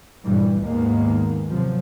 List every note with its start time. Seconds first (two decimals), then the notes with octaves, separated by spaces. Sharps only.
0.24 G2 A#2 E3 G3
0.65 D#2 G#2 D#3 G#3 A#3 B3
1.49 C3 F3 F#3